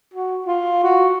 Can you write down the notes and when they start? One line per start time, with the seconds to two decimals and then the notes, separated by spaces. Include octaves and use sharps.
0.14 F#4
0.46 F4
0.83 F#4